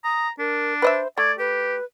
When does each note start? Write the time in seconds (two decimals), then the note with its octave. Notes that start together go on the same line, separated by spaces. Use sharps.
0.04 A#5 D#6
0.39 D4 A#4
0.82 B4 C5 D#5 E5
1.18 A3 D5 G#6
1.39 G4 B4